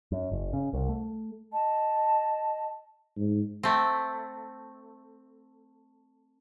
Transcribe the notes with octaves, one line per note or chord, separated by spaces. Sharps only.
F#2
F#1
C#3
C2
A3
D#5 A5
G#2
A3 C4